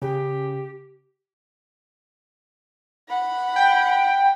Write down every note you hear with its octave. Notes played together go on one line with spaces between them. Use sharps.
C#3 G4
F#5 B5
G5